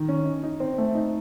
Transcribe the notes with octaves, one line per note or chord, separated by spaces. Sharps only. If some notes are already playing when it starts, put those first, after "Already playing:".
Already playing: D#3
C#4
D#4
D#4
C4
A3
D#4